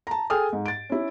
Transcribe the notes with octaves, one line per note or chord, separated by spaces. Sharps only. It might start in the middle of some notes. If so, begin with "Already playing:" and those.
A5 A#5
G#4 A4 G5 G#5 D#6 F6
G#2
A6 D7
C#4 E4